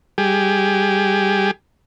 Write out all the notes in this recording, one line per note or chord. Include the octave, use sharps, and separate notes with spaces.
G3 G4 G#4